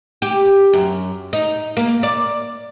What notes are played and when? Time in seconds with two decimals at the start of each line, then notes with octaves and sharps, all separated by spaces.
0.22 G4
0.73 F#2
1.33 D#4
1.77 A#3
2.03 D5